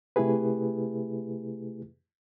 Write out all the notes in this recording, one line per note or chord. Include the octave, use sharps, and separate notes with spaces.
C3 A3 E4 G4 G#4 B4